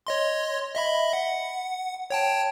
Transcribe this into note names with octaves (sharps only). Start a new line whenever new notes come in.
C#5 D#5 C6
D#5 E5 B5
F#5
C#5 G5 A5